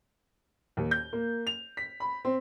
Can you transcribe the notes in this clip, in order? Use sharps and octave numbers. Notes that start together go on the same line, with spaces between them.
D#2
G6
A#3
F7
B6
B5
C4